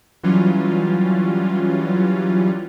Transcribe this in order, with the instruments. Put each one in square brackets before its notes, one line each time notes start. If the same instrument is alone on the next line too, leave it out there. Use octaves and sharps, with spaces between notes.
[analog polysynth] E3 F#3 G3 C#4 F4